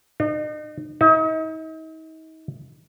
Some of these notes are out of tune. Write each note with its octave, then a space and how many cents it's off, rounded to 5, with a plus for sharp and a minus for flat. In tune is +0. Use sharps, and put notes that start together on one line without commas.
D#4 -40
D#4 +40